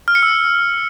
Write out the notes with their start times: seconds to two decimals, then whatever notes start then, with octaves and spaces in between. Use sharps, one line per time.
0.08 F6
0.15 C#7
0.23 E6